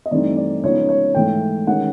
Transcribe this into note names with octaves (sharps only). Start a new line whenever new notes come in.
D#5
G2 E3 A3 C4 D#4 D5
D5
C#3 F3 G#3 B3 D#4 C#5
C#5
G#2 E3 A3 G5
D#3 G#3 C#4 F#5